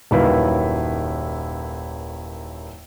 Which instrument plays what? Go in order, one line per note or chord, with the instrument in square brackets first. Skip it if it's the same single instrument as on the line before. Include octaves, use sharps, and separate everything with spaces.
[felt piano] D#1 F#2 D#3 E4 B4 F5